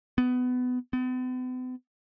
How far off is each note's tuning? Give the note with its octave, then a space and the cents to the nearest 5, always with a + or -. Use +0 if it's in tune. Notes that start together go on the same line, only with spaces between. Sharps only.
B3 +20
B3 +45